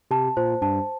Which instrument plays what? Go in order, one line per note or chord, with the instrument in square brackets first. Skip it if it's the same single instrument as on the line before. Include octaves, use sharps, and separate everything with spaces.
[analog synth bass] C3 [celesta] A5
[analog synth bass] A#2 [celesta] C5
[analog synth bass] G2 [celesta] A5